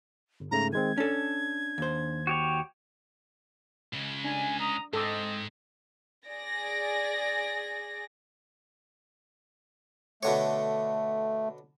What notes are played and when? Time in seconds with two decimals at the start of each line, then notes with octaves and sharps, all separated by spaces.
0.40 G1
0.51 G#2 C#3 A3 A#5
0.73 D#3 G#3 C4 G#6
0.98 C#4 D4 A4
1.78 D#2 C5
2.27 F#4 G4 C#5
3.93 C#2 C#3
4.25 D4 G#5
4.59 A#5 D#6
4.93 G#2 C4 A4 D#5 D6
6.27 G#4 D5 A#6
10.23 B2 D3 A3 C#5